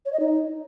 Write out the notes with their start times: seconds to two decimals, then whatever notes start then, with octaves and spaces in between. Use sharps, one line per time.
0.05 C#5
0.13 D#5
0.20 D#4